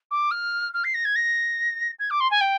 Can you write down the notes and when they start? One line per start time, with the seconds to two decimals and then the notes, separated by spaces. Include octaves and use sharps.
0.11 D6
0.31 F6
0.74 F6
0.84 C7
0.94 A#6
1.05 G#6
1.16 A#6
1.99 G#6
2.10 D6
2.20 C6
2.31 G#5
2.41 G5